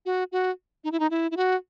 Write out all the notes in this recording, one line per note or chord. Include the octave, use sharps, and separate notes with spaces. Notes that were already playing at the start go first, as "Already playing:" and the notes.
F#4
F#4
D#4
E4
D#4
E4
E4
F#4